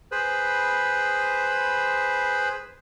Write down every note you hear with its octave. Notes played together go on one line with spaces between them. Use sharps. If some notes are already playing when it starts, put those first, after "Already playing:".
G#4 B4 C5 B5